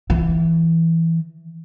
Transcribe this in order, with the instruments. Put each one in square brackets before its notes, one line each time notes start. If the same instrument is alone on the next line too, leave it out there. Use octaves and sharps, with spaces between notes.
[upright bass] E3